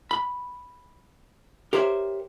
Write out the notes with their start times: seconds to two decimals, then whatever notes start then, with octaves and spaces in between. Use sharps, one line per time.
0.11 B5
1.73 G4 A#4 C5 C#5 E5 G5